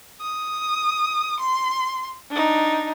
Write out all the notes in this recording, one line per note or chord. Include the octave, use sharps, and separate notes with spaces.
D#6
C6
D4 D#4